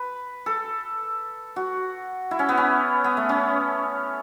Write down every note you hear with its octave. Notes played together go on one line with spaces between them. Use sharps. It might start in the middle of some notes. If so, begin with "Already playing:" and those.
Already playing: B4
A4
F#4
E4
C#4
B3
C#4
B3
A3
C#4